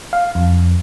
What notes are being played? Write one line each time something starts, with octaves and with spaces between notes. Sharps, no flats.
F5
F2